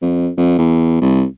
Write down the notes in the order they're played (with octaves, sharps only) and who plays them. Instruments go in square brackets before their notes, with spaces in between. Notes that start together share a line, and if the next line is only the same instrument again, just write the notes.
[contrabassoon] F2
F2
E2
C2